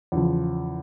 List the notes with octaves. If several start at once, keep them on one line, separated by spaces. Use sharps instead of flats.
E2 C#3 F3